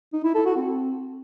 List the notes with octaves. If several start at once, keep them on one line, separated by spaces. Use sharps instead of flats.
D#4
E4
A4
F#4
C4